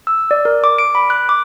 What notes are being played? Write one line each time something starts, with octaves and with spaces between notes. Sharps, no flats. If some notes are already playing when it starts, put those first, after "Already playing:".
E6
D5
A#4
D6
D7
B5
F#6
D6